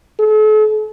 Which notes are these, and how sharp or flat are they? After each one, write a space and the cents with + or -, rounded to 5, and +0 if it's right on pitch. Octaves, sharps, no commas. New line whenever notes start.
A4 -40